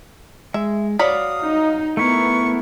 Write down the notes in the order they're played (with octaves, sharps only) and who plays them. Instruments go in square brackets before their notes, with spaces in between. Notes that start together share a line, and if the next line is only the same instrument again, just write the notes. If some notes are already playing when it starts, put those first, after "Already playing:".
[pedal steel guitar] G#3 [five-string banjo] E5
[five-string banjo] F#3 D5 B5 [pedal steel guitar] F5 [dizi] D#6
[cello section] D#4
[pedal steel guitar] A3 E4 A#4 [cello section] B3 [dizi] C#6